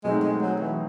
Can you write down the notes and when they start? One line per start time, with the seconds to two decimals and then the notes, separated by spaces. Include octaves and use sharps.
0.04 B2 F#3 G#3 A3 C4 D#4
0.23 G#3
0.41 F#3
0.60 E3